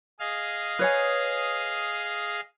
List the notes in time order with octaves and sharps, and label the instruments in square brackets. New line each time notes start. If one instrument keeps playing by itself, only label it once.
[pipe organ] G#4 D#5 F5
[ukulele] B4 C#5 G#5